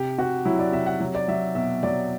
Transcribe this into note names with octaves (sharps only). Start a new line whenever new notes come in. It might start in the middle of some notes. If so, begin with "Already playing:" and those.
Already playing: C3 G4
C3 F#4
F#3 E4
D5
C3 E5
F#5
F#3
D5
F#3 E5
B2 E5
F#3 D5